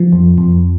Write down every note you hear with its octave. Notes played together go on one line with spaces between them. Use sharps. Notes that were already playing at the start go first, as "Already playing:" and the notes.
Already playing: F3
F2
F2